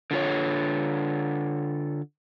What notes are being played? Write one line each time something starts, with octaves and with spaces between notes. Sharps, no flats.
D3 F4 C#5